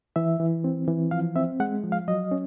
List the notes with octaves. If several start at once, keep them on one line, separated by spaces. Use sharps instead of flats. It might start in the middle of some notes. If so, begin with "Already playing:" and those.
E3 E5
E3
C4
E3
F3 F5
C4 E5
G#3 F#5
F3
F5
F#3 D#5
C#4